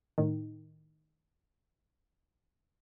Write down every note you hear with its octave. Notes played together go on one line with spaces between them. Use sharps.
A2 D#3